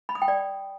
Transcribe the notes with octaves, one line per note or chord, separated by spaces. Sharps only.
B5
D#6
G5
D5